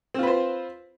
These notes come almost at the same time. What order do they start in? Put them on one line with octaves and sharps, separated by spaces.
C4 F4 B4 C5